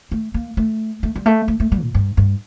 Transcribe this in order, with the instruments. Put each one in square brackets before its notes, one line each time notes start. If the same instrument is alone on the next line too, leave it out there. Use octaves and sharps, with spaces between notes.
[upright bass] A3
A#3
A3
A3
G3
A3
A3
A3
G3
A#2
G2
G2